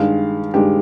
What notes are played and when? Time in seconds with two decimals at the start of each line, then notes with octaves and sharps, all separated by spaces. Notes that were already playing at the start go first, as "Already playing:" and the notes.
Already playing: G2 D#3 G#3 F5
0.54 G2 D#3 G#3 G4